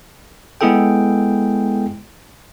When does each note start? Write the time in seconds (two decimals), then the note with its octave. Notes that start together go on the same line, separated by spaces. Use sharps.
0.61 G#3 B3 E4 G#4 A4 G5